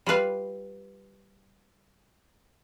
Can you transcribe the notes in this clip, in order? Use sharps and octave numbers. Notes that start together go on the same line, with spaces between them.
G3 F4 B4 F5